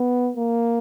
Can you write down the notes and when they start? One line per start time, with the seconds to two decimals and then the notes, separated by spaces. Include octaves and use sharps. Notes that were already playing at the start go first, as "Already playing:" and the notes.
Already playing: B3
0.37 A#3